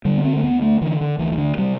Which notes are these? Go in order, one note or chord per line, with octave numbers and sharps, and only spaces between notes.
D3 G3
B3
C4
A3
D2 B3
A3
D3 E3
D3
D2 E3
E3
D3
C3 G3